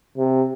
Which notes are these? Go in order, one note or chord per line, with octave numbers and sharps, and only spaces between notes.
C3